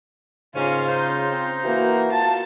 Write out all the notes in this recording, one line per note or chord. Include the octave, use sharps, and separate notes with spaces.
G#2 C#3 A#3 C#4 F4
D#4 C5
C4
E3 A#3 F#4
F4 A5